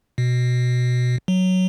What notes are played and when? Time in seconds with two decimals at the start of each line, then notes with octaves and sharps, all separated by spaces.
0.18 B2
1.28 F#3